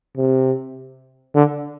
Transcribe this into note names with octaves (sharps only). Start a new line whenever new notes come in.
C3
D3